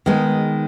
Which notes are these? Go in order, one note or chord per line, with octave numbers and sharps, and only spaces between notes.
D#3 G#3 B3